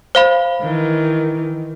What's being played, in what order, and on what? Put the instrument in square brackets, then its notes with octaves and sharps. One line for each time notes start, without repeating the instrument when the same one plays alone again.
[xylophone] C5 F5 B5
[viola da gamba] D#3 E3